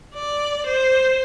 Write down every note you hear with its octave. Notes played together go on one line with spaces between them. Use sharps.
D5
C5